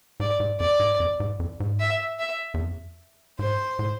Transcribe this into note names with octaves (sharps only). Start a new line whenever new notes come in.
G#2 D5
G#2
F2 D5
G#2
F2
G#2
F2
G#2
E5
E5
E2
F2
G#2 C5
A2